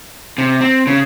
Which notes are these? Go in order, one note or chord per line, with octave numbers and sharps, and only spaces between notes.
C3
C4
C#3